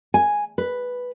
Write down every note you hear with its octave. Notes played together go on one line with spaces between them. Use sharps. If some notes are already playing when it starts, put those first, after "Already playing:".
G#5
B4